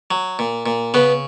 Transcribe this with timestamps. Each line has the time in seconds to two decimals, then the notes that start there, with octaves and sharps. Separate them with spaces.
0.11 F#3
0.39 A#2
0.66 A#2
0.94 C#3 B3 B4